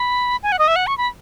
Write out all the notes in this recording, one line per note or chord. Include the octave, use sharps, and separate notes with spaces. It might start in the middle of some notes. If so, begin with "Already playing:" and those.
Already playing: B5
G#5
F#5
D#5
E5
F#5
C#6
B5